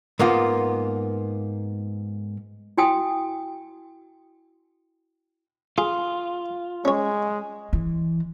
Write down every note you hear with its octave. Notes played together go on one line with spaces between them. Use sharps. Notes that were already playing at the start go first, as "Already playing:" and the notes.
G#2 A#3 B3 F4
E4 F#4 G5 G#5 D#6
F4 G#4
G#3 C#4 C#5
E3